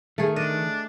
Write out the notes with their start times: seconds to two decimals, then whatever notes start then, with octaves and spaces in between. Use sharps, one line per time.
0.18 D#3 A3 G#4
0.36 D4 D#5